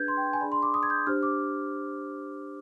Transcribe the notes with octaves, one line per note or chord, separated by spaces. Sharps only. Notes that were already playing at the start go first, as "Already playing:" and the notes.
Already playing: D4 G#4 B4 G6 G#6
C6
G5
G#5
D4 G#4 D5 B5
C6
D6
D#6
G#6
G6
D4 G4 C5 F6
D6